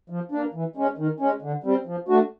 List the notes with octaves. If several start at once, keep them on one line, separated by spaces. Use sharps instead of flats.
F3
A#3 D4
E3
G#3 C#4
D#3
G#3 C#4
D3
G3 C4
F3
A3 D4 F#4